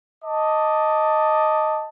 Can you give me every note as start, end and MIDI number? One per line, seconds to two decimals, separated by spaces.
0.25 1.89 75
0.25 1.89 81
0.25 1.89 86